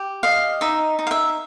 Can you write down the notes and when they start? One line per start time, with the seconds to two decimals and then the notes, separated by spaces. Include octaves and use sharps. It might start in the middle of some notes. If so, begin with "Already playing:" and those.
Already playing: G4
0.23 D#5 F5
0.61 D#4 E5
0.99 D#4
1.07 F5
1.11 E5